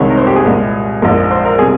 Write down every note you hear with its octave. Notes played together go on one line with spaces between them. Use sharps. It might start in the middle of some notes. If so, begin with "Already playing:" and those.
Already playing: C2 C3 D#3 G#3 C#5
A#4
C5
G4
G#4
C2 A#2 G#3
A#1 G#2 F3 G#3 A#4
C5
A#4
C3 G3 G#4